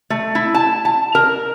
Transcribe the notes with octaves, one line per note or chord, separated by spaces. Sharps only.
A3
E4
A5
A5
A#4